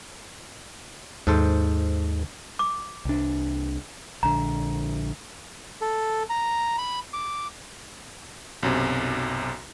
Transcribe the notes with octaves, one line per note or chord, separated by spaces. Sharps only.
D#2 G#2 A4 C5
D6
C2 D4
A#1 D3 A#5
A4
A#5
B5
D6
B1 F#2 C3